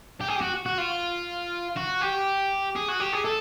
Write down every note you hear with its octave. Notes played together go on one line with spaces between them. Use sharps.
G4
G#4
G4
F#4
F#4
F4
F#4
G4
G#4
F#4
G4
G#4
A4